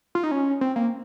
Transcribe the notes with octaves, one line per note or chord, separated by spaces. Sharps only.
F4
D#4
C#4
C4
A#3